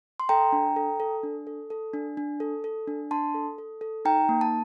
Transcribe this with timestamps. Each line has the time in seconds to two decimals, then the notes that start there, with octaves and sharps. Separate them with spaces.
0.20 C6
0.29 A4 G5 A#5
0.52 D4
0.76 A4
1.00 A4
1.23 D4
1.47 A4
1.70 A4
1.94 D4
2.17 D4
2.40 A4
2.64 A4
2.88 D4
3.11 D4 A5 C6
3.35 A4
3.58 A4
3.81 A4
4.05 D#4 G5 A#5
4.29 A#3
4.41 A5